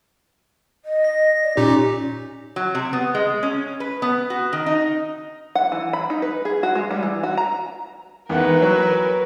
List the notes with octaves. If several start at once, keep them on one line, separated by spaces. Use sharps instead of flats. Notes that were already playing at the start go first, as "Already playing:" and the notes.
D#5
A#6
D5
A#2 C#4 D#4 G4
F#3
C3
B3
G#3
C#4
B4
B3
F#4
D#3
D#4
F#5
E3
B5
D#4
B4
G#4
F#4
G#3
G3
E3
F#4
A#5
E2 D#3 A#4 B4 F#5
E3 F#3